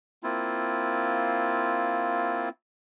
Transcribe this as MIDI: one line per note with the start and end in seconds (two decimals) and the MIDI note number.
0.24 2.49 58
0.24 2.49 60
0.24 2.49 64
0.24 2.49 65